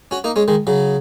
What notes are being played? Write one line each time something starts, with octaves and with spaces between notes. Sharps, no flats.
C#4 F#4
A#3 D#4
G#3 C#4
D#3 G#3
C#3 F#3